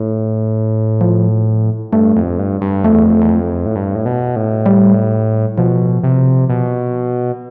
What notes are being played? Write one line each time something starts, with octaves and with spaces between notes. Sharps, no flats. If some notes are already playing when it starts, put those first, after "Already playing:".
Already playing: A2
F3
G2 A3
F2
G2
G2
F2 A3
E2
F2
E2
F2
A2
G2
A2
B2
A2
G3
B2 F3
C3
B2